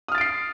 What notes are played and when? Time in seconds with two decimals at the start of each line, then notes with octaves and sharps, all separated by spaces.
0.08 D#6
0.12 F6
0.15 A6
0.18 D7
0.21 C7